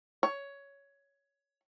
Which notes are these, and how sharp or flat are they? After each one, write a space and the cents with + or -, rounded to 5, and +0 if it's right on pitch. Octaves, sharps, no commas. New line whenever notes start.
C#5 +10